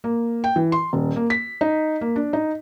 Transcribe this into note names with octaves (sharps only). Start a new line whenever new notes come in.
A#3
G5
E3
C6
D#1
A#3
B6
D#4
A#3
D4
D#4